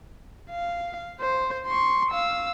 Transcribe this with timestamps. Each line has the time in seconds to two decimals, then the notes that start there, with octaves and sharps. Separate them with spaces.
0.51 F5
1.21 C5
1.67 C6 C#6
2.11 F5 E6